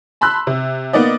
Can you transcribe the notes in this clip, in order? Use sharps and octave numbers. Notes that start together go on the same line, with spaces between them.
A5 B5 C6 E6 F#6
C3
A#3 B3 D#4 D5 D#5